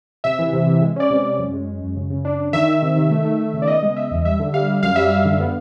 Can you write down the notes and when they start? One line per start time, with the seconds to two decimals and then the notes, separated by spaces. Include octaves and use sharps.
0.24 C3 E5
0.39 E3
0.53 C3
0.67 C3
0.81 G#3
0.96 C#4 D5
1.10 C3
1.24 C#4
1.39 F#2
1.53 G#3
1.67 G#3
1.82 F#2
1.96 C#3
2.10 C#3
2.25 D4
2.39 D4
2.53 D#3 E5
2.67 D#3
2.82 C3
2.96 D#3
3.11 A3
3.25 A3
3.40 A3
3.54 C#3
3.62 D5
3.67 B3 D#5
3.83 G#3
3.97 G#3 E5
4.11 E2
4.25 G3 E5
4.40 D3
4.54 G3 F5
4.68 G3
4.83 F#2 F5
4.96 G3 E5
5.10 G3 F5
5.25 D3
5.40 B3